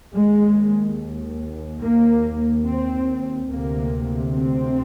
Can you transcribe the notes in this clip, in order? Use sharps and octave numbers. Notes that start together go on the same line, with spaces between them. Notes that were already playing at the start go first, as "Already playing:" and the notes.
D#2 G#3
A#3
C4
D2 C3 A#3
C4